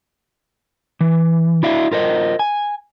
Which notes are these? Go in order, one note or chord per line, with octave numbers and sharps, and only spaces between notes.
E3
E4 F#4 D5 E5 F5
F4 A#4 C5 D#5
G#5